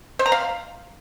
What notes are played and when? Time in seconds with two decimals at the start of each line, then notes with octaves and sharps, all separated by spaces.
0.19 C5
0.26 A#5
0.32 F5